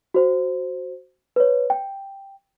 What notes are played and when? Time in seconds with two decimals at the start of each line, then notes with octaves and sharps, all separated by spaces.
0.14 F#4 C5
1.36 B4 C#5
1.70 G5